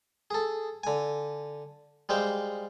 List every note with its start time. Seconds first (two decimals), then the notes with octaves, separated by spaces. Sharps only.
0.31 G#4 A4
0.84 D3 G#5
2.09 G3 G#3 C5 F5 G5